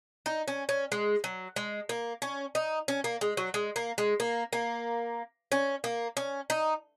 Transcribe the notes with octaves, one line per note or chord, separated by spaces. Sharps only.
D#4
C#4
C#4
G#3
F#3
G#3
A#3
C#4
D#4
C#4
A#3
G#3
F#3
G#3
A#3
G#3
A#3
A#3
C#4
A#3
C#4
D#4